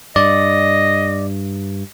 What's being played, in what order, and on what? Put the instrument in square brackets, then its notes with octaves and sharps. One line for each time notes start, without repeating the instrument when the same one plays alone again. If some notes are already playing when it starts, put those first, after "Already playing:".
[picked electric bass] G2 [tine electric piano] D5 [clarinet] D#5